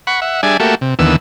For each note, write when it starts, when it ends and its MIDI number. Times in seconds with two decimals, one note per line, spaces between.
0.07 0.20 78
0.07 0.20 83
0.07 0.20 85
0.22 0.41 76
0.22 0.41 78
0.43 0.57 55
0.43 0.57 62
0.43 0.57 68
0.43 0.57 74
0.43 0.57 76
0.43 0.57 80
0.60 0.75 57
0.60 0.75 58
0.60 0.75 66
0.60 0.75 67
0.60 0.75 69
0.60 0.75 76
0.81 0.94 48
0.99 1.16 39
0.99 1.16 50
0.99 1.16 52
0.99 1.16 59
0.99 1.16 88